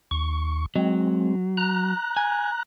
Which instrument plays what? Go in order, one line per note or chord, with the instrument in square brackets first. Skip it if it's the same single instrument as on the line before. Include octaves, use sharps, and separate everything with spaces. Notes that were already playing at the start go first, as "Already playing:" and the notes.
[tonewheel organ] D#2 C#6
[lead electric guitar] F#3 [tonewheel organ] G#3 C4
[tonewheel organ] A#5 F#6
[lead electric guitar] G#5